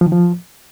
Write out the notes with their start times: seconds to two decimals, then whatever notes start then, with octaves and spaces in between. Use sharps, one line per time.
0.01 F3
0.06 D#3
0.12 F3